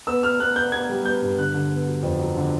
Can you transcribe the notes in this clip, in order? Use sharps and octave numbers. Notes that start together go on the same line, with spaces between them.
B3 E6
B3 F6
B3 F#6
B3 G6
B3 G#6
G3
B3 G6
G2
D3 F#6
D3
B3
F#3
F2
F#3
D3